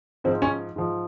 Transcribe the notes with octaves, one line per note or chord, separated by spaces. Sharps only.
G#2 F3 C4
C#4
G#2 F3